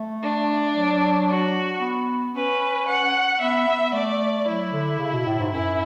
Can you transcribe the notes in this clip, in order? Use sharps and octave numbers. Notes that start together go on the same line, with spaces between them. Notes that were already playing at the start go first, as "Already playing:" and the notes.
Already playing: A3
D4
F#3
F#4
B3
C#4 B4
F#5
B3 E5
B3
A3 D5
F#3 E4
D3
C#3
B2
A2
G#2
F#2 E4